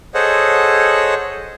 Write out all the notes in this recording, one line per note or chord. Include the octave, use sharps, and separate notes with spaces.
G#4 A4 C5 C#5 D#5 F#5